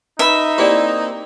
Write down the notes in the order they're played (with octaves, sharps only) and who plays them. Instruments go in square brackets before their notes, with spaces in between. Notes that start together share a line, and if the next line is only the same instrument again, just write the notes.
[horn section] D#4 [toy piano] B4 A#5 B5 [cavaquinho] E5
[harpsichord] A#3 C4 E4 [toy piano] G4 G#4 D5